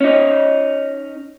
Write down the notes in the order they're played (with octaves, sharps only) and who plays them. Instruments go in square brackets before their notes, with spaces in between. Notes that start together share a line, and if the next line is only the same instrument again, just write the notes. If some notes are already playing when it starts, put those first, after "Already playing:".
[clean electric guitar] C#4 D#4